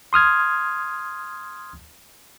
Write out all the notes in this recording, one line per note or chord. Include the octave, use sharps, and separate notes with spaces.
C6 D#6 F6 G#6